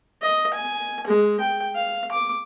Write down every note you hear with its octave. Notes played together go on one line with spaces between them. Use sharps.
D#5
G#5
G#3
G5
F5
D6